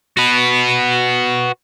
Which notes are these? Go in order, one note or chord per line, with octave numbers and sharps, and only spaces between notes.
F#4 B4